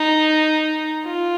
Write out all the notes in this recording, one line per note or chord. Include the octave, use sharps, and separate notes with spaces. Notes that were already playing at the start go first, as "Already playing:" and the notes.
Already playing: D#4
F4